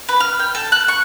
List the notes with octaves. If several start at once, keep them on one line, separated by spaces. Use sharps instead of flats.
B4
F6
G5
A4
F#6
C#6